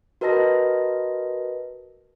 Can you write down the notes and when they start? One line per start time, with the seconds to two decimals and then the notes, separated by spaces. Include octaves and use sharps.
0.21 F#4 A#4 B4 D#5 A5 A#6